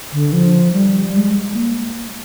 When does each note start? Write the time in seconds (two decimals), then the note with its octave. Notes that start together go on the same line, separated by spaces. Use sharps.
0.13 D3
0.33 F3
0.73 G3
1.14 G#3
1.54 A#3